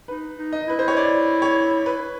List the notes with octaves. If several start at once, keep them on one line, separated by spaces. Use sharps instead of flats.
D#4 B4
D#4
D#5
E4 B4
C5
C#5
D5
C#5
B4